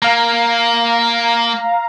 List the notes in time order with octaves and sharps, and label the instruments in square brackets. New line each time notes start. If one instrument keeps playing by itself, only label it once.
[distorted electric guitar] A#3 [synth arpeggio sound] F5 A#5